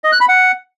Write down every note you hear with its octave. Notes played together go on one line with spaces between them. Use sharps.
D#5
F#6
B5
F#5